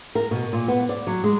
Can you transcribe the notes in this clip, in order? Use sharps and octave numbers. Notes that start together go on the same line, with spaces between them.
A#4
B2
A#2
B3
D5
F#3
G#3